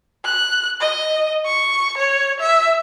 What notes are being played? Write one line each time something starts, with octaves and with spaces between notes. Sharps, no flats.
F#6
D#5
C#6
C#5
E5